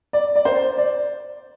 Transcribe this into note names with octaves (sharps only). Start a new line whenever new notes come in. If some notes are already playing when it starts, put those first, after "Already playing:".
D5
D5
C5
D5